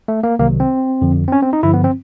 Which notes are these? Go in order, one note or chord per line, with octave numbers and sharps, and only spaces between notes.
A3
A#3
C2 C3 D#3 F#3 A#3
C4
F2 D3 F3
C4
C#4
C4
D#4
G2 D3 F3 E4
B3
C4